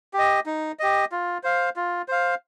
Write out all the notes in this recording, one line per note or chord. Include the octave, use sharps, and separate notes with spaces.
G4 D#5
D#4
G4 D#5
F4
C5 F5
F4
C5 F5